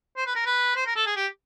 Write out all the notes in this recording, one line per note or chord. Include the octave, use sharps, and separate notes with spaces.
C5
B4
A#4
B4
C5
A#4
A4
G#4
G4